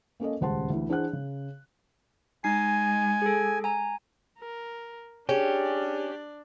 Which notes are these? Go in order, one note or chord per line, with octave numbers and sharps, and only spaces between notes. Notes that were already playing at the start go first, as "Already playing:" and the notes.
A#3 C#4 A4 D#5
D#1 C#2 C5 F#5 A5 C6
D2 E3
E3 D4 G#4 C5 F#5 F#6
C#3
G#3 D#4 G#5 C7
G#4 A4
G#5 A#5
A#4
C#4 D4 G4 G#4 D5